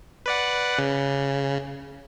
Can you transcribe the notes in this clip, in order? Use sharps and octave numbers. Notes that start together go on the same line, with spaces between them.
B4 D5 F#5
C#3